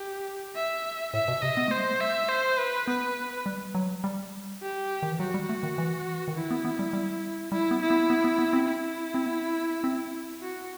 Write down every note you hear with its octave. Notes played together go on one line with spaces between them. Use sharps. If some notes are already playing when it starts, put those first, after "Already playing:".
Already playing: G4
E5
A2 E5
B2
C3 D#5
B3
A3 C5
G3
A3
E5
C5
B4
B3 B4
G3
F#3
G3
G4
D#3
E3
F#3 F#4
G3
A3
D#3
E3
D#3
E3 E4
B3
B3
G3
G3
G3 E4
B3
E4
B3
B3
B3
B3
C4
E4
C4
B3
C4
F#4